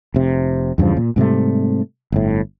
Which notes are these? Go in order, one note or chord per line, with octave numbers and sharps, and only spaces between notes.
F1 C3
E2 G2 C#3 F3
A#2
G#2 C3 G3 A3
G1 A2